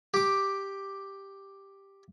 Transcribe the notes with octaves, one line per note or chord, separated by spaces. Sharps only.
G4 D6